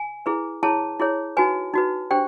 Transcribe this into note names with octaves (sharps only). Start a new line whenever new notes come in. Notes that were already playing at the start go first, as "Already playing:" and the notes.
Already playing: G#5
E4 G#4 B4
E4 G#4 C#5 A5
E4 G#4 C#5
D#4 F#4 B4 G#5
D#4 F#4 B4
D4 G4 C5 G5